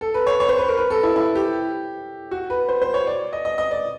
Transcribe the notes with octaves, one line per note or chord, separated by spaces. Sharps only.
A4
B4
C#5
C#5
C5
B4
A#4
B4
A4
E4
E4
G4
F#4
B4
C5
C5
C#5
D5
D#5
D#5
D#5
D5